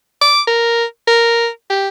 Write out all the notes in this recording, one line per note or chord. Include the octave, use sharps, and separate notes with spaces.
D6
A#4
A#4
G4